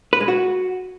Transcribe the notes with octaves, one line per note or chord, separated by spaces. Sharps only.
B4
G#3
F#4